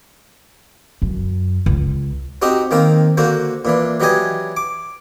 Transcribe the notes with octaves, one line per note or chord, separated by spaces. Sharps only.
F#2
C#2
C4 D#4 F#4 G4 D#5
D#3 A#3 C4 A#4
D3 A#3 F#4 C5
A#2 E3 D4
E3 F#3 D4 G4 D#5 G#5
D6